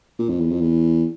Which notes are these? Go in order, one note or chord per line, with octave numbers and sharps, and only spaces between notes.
A#2
F2
E2
F2
E2